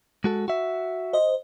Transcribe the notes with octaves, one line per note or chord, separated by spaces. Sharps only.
G#3 F#4 A4
F#4 E5
C5 D#5